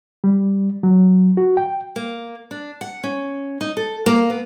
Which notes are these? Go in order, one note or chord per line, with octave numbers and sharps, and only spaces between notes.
G3
F#3
F#4
G5
A#3
D4
F#5
C#4
D#4
A4
A#3
B3